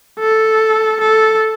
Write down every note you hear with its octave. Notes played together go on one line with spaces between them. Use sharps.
A4
A4